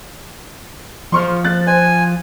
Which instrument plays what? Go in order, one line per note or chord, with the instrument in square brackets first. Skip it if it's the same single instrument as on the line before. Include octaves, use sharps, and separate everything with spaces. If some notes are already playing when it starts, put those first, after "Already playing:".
[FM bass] F3 [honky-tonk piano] C6 C#6 F6
[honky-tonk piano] F#6 A6
[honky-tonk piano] C5 [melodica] G#5